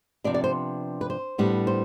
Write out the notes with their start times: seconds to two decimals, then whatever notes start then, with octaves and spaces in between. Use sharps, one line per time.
0.24 C3 F3 B3 D4 D5
0.34 D5
0.44 C5
1.01 B4
1.10 C5
1.38 A2 G3 B3 D4
1.67 C5